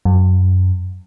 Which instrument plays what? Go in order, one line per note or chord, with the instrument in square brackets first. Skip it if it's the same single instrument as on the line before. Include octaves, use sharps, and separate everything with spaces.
[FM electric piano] F#2